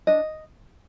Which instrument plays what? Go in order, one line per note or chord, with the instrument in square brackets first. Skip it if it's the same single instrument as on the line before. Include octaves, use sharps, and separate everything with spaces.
[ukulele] D4 D#5